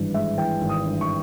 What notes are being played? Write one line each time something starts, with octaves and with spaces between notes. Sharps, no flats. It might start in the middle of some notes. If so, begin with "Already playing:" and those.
Already playing: G#1 G2 E3
G#3 E5
E3 G5
G#1
D#6
G2
C#6